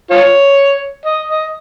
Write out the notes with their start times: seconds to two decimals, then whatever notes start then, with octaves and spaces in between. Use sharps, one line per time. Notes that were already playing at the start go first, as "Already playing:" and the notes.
0.11 F4 C#5
1.05 D#5
1.28 D#5